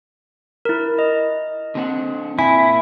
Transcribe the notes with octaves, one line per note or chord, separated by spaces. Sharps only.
E4 A#4
D#5
D3 C4 F#5
A#2 E4 G#5 B6